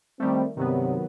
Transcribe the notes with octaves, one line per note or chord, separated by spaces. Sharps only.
D#3 G3 A3 C4
G2 C3 D#3 F#3 B3